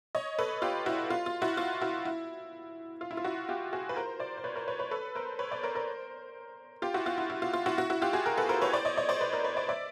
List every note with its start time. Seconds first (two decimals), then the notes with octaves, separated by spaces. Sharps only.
0.15 C#5 D#5
0.38 A4 B4
0.62 F4 G4
0.86 E4 F#4
1.10 F4
1.26 F4
1.42 E4 F#4
1.57 F4
1.81 E4 F#4
2.05 E4
3.01 F4
3.11 E4
3.17 F4
3.24 E4 F#4
3.49 F4 G4
3.73 F#4 G#4
3.89 B4
3.96 A#4 C5
4.20 C5 D5
4.37 C5
4.44 B4 C#5
4.56 A#4 C5
4.68 B4 C#5
4.79 B4 C#5
4.91 A4 B4
5.15 A#4 C5
5.39 B4 C#5
5.51 C5 D5
5.63 A#4 C5
5.75 A#4 C5
6.82 F4 G4
6.94 E4 F#4
7.06 F4
7.18 E4
7.30 E4
7.42 F4
7.53 F4
7.66 E4 F#4
7.78 E4 F#4
7.90 E4 F#4
8.02 F4 G4
8.13 F#4 G#4
8.26 G#4 A#4
8.37 A4 B4
8.49 A#4 C5
8.62 B4 C#5
8.73 C5 D5
8.85 C#5 D#5
8.97 C#5 D#5
9.09 C5 D5
9.21 B4 C#5
9.33 A#4 C5
9.44 B4 C#5
9.57 C5 D5
9.69 D5 E5